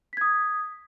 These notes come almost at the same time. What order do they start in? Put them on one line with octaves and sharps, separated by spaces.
B6 G#6 D#6